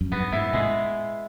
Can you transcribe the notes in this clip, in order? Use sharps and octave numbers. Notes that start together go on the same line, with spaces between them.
F#2
G2 B3
G#2 E4
A2 G#3